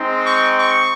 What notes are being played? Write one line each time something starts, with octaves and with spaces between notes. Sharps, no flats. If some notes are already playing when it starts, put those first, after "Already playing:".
Already playing: G#3 C4 D#4
C#6
C#6